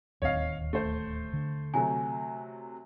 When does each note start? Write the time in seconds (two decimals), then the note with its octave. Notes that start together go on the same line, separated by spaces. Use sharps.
0.22 D1 D#2 C4 C#5 D#5 F5
0.73 A3 C5
1.33 D3
1.74 C3 F#3 A3 G#5